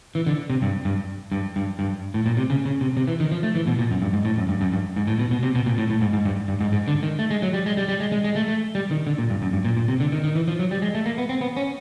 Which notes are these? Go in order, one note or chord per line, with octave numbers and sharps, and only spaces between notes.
E3
D3
C3
G2
G2
G2
G2
G2
A2
A#2
C3
C#3
C#3
C3
C3
E3
D#3
F3
A3
E3
B2
A#2
F#2
G2
G#2
A2
F#2
G2
F#2
G2
G#2
A2
B2
B2
C3
B2
A#2
A2
A2
G#2
G#2
G2
G2
G#2
G#2
D3
D#3
A3
G#3
F#3
G3
G#3
G3
G3
G#3
G#3
G#3
A3
A3
G3
D#3
D3
A#2
G2
F#2
G2
A#2
A#2
C3
D3
D#3
D#3
E3
F3
F#3
G3
G#3
A3
A#3
B3
C4
B3
C#4